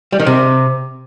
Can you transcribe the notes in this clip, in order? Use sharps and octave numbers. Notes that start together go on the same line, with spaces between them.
G3
D#3
C3